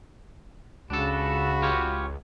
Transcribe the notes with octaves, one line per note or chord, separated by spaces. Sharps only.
C#2 C#3 D4 F#4 A4 B5
F4 G4 C#5